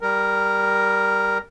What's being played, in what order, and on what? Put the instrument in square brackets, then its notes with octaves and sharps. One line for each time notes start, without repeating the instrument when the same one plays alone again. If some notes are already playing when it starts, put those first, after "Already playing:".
[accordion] G3 A#4